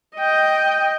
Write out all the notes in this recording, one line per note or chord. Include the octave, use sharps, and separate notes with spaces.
D#5 G5